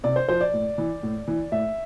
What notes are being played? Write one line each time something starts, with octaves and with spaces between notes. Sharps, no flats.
C3 D5
C5
F3 C5
D5
A2
E3
A2
E3
A2 E5